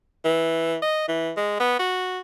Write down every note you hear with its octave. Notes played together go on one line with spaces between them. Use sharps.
E3
D#5
E3
G#3
B3
F#4